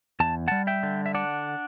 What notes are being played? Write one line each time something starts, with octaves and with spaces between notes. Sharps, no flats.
E2 A5
G3 F#5 A5
E5 G5
D3
E5
D4 D5 F#5